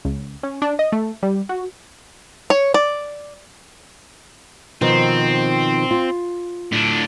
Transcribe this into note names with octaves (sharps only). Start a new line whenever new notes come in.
C#2
C#4
D4
D#5
A3
G3
F#4
C#5
D5
B2 D#3 F3 C4
F4
A2 D4